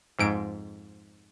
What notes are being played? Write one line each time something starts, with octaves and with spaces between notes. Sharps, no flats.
F2 G#2 D7